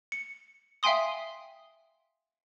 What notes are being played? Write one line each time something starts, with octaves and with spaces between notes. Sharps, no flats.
C#7
E5 F5 G5 G#5 C6 D#6